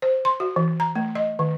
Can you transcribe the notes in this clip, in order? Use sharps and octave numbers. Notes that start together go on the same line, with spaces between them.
C5
C6
F#4
E3
A#5
A3
D#5
D#3